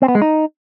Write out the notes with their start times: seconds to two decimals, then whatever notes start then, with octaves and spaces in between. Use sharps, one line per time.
0.02 C4
0.08 B3
0.15 G#3
0.22 D#4